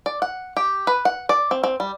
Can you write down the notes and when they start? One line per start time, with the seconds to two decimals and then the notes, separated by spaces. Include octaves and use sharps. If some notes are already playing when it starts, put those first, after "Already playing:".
0.06 D5
0.22 F#5
0.57 G4
0.87 B4
1.05 F#5
1.29 D5
1.51 C4
1.64 C4
1.80 G3